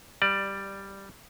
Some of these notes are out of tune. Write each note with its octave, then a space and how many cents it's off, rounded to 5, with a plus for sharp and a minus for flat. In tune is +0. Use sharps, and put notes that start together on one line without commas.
G3 +0 D5 +15